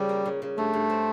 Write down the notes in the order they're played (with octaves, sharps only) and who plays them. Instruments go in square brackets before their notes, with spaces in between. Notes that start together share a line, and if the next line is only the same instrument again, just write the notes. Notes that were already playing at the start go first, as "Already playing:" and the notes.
Already playing: [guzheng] C#3 F3 [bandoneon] G3
[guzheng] A#3
C#3
C#3
[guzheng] G2 [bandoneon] A3
[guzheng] G2
C4